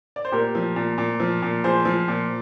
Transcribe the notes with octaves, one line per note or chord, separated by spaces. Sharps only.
D5
C5
A#2 G4 A#4
F3
A#2
A#2
F3
A#2
F3 G#4 C5
F3
A#2